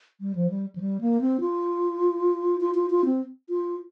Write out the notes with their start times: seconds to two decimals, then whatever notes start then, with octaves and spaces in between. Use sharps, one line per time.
0.21 G3
0.35 F3
0.50 G3
0.76 F3
0.80 G3
1.01 A#3
1.21 C4
1.40 F4
2.60 F4
2.74 F4
2.90 F4
3.05 C4
3.50 F4